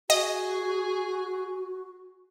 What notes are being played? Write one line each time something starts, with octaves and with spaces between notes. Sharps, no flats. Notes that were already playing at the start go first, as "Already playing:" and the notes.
F#4 G#4 D#5